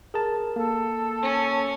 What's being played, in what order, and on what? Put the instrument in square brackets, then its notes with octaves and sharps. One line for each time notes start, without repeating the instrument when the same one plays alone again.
[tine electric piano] G#4 A#4 A5
[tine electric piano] A#3 [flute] A4
[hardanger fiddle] C#4